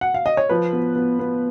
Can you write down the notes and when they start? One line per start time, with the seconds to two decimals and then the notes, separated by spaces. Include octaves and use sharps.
0.01 F#5
0.14 F5
0.26 D#5
0.37 C#5
0.49 F3 B4
0.73 B3
0.96 B3
1.19 B3